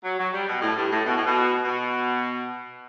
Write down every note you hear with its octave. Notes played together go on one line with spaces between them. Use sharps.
F#3
F#3
G3
B2
A2
G2
A2
B2
A2
B2
B2